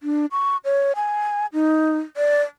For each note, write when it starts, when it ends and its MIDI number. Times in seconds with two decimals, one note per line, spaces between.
0.03 0.26 62
0.32 0.57 85
0.65 0.92 73
0.96 1.46 80
1.53 1.98 63
2.17 2.42 74